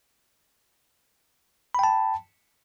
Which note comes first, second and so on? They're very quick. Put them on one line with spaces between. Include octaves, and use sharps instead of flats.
B5 G5 A5